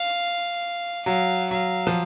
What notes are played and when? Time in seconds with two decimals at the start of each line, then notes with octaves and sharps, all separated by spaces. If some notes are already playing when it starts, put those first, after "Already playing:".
Already playing: F5
1.06 F#3 F5
1.51 F#3 F5
1.87 F3